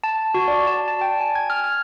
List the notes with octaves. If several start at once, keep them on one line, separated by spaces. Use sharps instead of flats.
A5
F#4
D5
A5
A5
G5
G#5
G#6
F6
F6